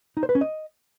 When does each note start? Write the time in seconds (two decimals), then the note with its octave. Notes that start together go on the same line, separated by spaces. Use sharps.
0.17 D#4
0.23 C5
0.29 B4
0.35 C#4
0.41 D#5